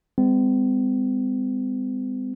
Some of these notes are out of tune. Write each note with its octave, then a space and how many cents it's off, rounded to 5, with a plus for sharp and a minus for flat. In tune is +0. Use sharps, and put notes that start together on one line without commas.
G#3 -45 C4 -45